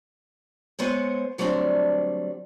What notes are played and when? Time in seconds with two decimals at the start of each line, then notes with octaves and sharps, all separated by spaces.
0.79 G#3 B3 C5 C#5
1.38 D3 F#3 G3 A3 C4 D4